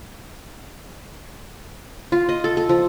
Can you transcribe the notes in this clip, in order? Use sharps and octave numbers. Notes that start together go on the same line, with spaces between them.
F4
D#5
A4
A4
F3